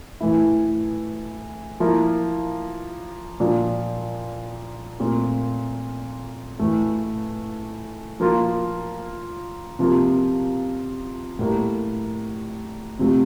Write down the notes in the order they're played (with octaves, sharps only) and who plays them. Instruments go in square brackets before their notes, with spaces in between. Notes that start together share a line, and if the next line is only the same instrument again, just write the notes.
[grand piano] A2 E3 A3 E4
F3 A#3 E4
A#2 F3 A#3 D4
A#2 A3 C4 F4
A2 E3 A3
F3 A#3 F4
C3 F3 A#3 F4
A2 G3 A#3
C3 F3 A3 C4